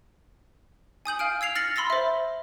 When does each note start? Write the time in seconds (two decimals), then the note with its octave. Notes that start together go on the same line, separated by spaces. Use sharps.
1.05 G#5 D#6 G6 F#7
1.19 F5 G#5 F6 D7
1.41 E6 G#6 C7 F7
1.56 F6 A6 A#6 C#7 F#7
1.76 B5 C6 E6 A6 A#6
1.90 C5 E5